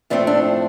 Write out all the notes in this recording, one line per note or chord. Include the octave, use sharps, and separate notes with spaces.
A2 F3 A3 C4 D4
D4